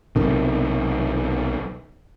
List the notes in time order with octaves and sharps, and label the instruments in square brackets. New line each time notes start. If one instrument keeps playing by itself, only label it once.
[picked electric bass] B1 C3 D#3